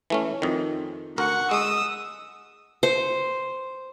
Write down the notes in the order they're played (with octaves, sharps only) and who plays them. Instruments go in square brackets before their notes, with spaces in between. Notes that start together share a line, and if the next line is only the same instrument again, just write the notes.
[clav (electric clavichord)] E3 A3 C#4
F2 D#3
[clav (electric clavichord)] D2 A#4 [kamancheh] F#5 C#6
[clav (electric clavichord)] G#3 [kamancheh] D#6 E6
[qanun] C5